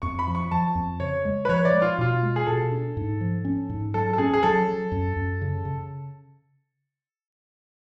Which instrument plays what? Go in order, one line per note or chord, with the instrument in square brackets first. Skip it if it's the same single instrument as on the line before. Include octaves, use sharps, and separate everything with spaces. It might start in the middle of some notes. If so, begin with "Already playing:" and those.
[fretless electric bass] F2 [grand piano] C#6
[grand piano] B5
[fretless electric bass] F3
[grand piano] C#6
[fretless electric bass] F3 [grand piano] A5
[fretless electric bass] F2
[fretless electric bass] C#3 [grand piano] C#5
[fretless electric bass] G#3
[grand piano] B4
[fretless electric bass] F3 [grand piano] C#5
[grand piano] D5
[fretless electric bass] G#3
[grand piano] F4
[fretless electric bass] B2 [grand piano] F4
[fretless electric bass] G#3
[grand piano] G#4
[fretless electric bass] B2 [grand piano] A4
[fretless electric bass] D4
G#2
F3
C#4
G#2
[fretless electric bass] F#3 [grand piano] A4
[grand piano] A4
[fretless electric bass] C#4 [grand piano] G#4
[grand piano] G#4
[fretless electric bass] F#3 [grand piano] A4
[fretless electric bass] F#3
F#2
F#2
C#3
C#3